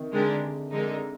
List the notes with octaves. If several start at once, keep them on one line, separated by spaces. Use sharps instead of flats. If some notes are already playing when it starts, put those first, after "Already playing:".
Already playing: C3 D#3
D3 G#3 D4 G4 A#4
D3 G#3 D#4 A#4